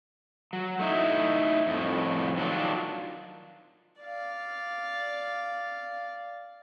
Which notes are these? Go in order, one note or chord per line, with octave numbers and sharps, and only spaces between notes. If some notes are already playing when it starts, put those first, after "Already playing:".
F#3
A3 D#4 E4
F2 A2
D#3 F#3 D4 F4
D5 F5